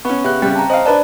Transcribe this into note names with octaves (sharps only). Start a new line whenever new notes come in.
B3 C#4 C#6
C#3 B3 G4 E5 F#6
C#3 G3 C4 G5
A5 A#5
C5 D#5 F5
D4 B4 D5 A5